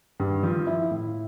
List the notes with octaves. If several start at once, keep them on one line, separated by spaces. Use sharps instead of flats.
G2
F3
E4
A2